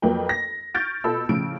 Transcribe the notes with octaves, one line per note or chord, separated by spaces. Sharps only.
F2 F#3 A#3 F4 B4 G5
A#6
C#6 F6 G6 A6 D7
B2 F4 A4 B5 E6
A2 C#3 F3 D7